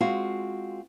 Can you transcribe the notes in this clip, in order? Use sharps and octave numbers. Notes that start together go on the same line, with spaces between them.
G#3 C4 F4 F#4 G#4 F5